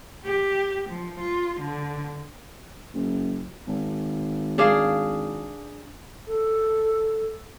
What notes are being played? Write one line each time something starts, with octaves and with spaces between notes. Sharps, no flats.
G4
F3
F4
D3
F#1
G#1
D4 G#4 F5
A4